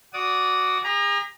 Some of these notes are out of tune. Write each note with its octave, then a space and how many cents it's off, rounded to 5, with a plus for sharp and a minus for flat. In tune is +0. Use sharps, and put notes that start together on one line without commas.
F#4 +0 D5 -15 D#6 +0
G#4 -45 A#5 +15